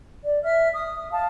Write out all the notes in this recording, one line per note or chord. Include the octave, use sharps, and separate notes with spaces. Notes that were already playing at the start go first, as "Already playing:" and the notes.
D5
E5 F6
D#6
F5 A5